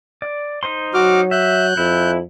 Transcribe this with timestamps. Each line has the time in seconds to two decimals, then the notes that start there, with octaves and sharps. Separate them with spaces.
0.22 D5
0.63 D#4 C5 C6
0.94 F#3 F#4 D6 F6
1.31 E5 F#6 G6
1.77 F2 E4